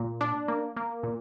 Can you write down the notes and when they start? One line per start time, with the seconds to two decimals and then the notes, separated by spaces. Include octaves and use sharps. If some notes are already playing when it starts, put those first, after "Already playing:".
Already playing: A#2
0.21 D4
0.48 A#3
0.77 A#3
1.03 A#2